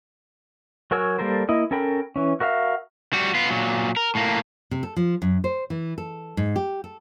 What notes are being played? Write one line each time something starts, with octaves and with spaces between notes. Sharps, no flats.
F#3 F#4 A#4 G#5 E6
G3 A#3 A4 A#4 C5
A#3 E4 D#5
C#4 A4 A#4 G5 B5
E3 C#4
F#4 A#4 E5 F5
G3 F#4
B3 F4
A#2 F#3
A#4
A2 A#3
C3
A4
F3
F#2
C5
E3
A4
G#2
G4
A4